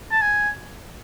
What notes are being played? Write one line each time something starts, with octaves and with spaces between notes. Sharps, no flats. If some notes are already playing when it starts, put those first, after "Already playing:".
A5
G#5